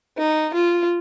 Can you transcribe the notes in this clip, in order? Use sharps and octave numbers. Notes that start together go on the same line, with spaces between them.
D#4
F4